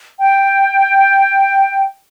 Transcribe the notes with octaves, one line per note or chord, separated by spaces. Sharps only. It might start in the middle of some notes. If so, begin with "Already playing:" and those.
G5